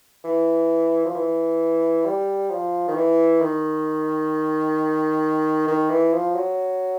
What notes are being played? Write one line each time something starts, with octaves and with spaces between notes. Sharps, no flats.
E3
F3
E3
G3
F3
D#3
E3
D#3
D#3
E3
F3
F#3